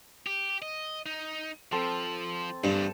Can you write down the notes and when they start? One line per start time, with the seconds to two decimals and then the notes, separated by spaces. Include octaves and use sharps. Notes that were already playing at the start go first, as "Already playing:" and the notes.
0.27 G4
0.62 D#5
1.06 D#4
1.72 F3 C4 A4
2.64 E2 G2 D3